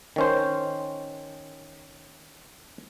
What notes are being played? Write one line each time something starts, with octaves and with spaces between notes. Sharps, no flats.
D#3 C#4 C5